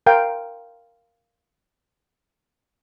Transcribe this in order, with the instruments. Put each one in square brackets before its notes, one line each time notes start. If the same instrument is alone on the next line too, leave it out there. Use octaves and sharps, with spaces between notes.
[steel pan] A#4 F5 G5